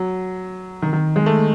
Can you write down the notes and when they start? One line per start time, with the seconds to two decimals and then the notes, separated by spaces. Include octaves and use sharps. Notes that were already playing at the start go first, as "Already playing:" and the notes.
Already playing: F#3
0.82 D#3
0.93 D#3
1.16 G#3
1.26 A3